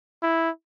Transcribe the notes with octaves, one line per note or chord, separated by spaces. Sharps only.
E4